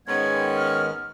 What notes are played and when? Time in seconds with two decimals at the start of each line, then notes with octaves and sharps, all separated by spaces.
0.07 G#2 D#3 G#3 B3 C#4 G#6
0.57 F6